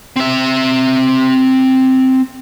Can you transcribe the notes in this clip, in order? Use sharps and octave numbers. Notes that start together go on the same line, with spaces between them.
C4 E5